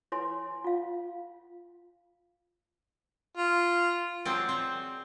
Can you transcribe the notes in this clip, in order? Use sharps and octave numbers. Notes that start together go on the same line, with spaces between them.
E4 B4 C#5 G#5 C6
F4 F5
F4
F#3 C4 G#4 D5
C4